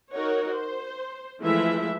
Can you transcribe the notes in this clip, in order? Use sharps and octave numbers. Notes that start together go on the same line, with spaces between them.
D#4 F#4 A#4 C#5
C5
E3 F3 G#3 A3 E4 E5